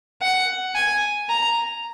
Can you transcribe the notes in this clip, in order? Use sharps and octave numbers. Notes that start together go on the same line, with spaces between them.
F#5
G#5
A#5